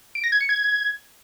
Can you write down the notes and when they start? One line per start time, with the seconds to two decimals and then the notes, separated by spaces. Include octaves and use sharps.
0.15 D7
0.24 A#6
0.32 G#6
0.41 C#7
0.49 G#6